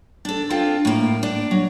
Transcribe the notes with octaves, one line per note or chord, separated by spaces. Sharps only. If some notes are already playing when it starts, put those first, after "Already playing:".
D4 A4
C4 D4 F4 A4
A2 A#3
D4
F#3